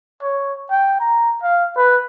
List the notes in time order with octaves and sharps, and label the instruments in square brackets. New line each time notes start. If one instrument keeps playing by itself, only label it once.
[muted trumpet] C#5
G5
A#5
F5
B4